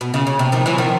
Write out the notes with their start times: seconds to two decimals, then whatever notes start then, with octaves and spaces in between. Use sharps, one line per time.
0.01 B2
0.14 C#3
0.27 C#3
0.39 C3
0.52 D#3 F3
0.66 E3 F#3
0.78 D#3 F3